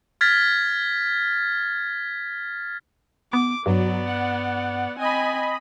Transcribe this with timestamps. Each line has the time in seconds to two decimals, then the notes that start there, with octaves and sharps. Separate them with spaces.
0.21 F6 G#6 A6 B6
3.33 B3 D6
3.66 G2 F#3 B3 D5
4.06 F#5
4.99 C4 D#5 G#5 B5